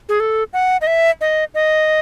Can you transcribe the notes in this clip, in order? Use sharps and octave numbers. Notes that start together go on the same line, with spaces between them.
G#4
A4
F#5
D#5
E5
D#5
D#5